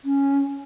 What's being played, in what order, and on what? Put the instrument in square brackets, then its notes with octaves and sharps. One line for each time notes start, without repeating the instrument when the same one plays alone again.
[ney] C#4